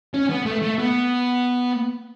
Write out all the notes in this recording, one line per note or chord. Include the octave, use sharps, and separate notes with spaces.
C#4
B3
A3
A3
B3